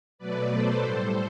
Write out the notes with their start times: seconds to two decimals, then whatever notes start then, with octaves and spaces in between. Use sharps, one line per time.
0.19 B2 F#3 A3 B4 D5
0.50 A4 C5
0.82 A2 G3